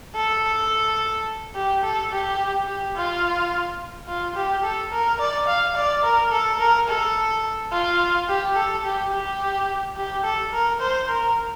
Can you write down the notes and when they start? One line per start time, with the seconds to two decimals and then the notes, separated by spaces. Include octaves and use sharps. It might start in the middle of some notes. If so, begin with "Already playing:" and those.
0.15 A4
1.55 G4
1.83 A4
2.11 G4
2.67 G4
2.95 F4
4.08 F4
4.36 G4
4.64 A4
4.92 A#4
5.20 D5
5.48 F5
5.76 D5
6.04 A#4
6.31 A4
6.59 A#4
6.88 A4
7.72 F4
8.28 G4
8.56 A4
8.84 G4
9.12 G4
9.96 G4
10.24 A4
10.52 A#4
10.80 C5
11.08 A#4